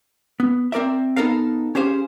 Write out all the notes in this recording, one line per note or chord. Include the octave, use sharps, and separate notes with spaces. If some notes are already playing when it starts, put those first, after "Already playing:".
B3
C4 A#4 D5 E5
B3 D#4 A4 A#4 F5
C#4 G4 G#4 C5 F5